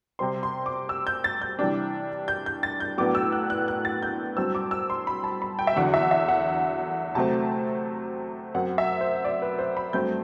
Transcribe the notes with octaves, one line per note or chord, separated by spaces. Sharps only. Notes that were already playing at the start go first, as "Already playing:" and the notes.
C3 G3 C4 C6
C6
D6
E6
G6
A6
G6
C3 E3 G3 D4
G6
G6
A6
G6
A2 F#3 B3 D4 D6
E6
F#6
F#6
F#6
A6
G6
G2 F#3 C4 E6
D6
E6
C6
B5
A5
B5
G5
E5
E2 D3 F#3 F#5
E5
E5
F#5
C3 F#3 A3 C4 A5
F#2 F#3 C4 F#5
E5
C5
D5
B4
C5
B5
G2 F#3 A3 C4 G6